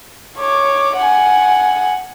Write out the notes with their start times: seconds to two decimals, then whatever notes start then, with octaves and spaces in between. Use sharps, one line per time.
0.38 C#5 D6
0.97 F#5 G#5